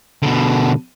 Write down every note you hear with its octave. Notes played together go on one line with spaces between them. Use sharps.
B2 D3